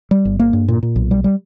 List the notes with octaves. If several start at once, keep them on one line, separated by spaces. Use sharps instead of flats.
G3
G1
A#3
G2
A#2
A#2
B1
G3
G3